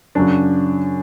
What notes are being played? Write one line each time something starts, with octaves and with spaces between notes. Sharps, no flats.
F#2 C#3 F#3 D4